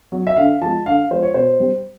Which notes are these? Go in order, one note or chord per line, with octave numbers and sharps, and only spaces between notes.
F#3
E5
D3 F5
F3 G#3 A5
D3 F5
F3 G#3 C5
C#5
B2 C5
G3